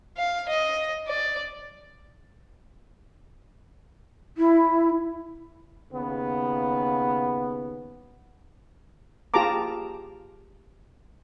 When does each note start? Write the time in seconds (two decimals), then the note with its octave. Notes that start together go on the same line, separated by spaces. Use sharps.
0.17 F5
0.49 D#5
1.08 D5
4.37 E4
5.92 D#2 C#3 B3
9.34 F4 G4 G#4 A5 A#5 D6